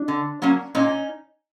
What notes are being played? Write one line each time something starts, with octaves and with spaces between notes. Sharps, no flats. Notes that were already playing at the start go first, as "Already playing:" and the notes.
Already playing: D4
D3
F#3 A#3 C#4
A#2 C#4 D#4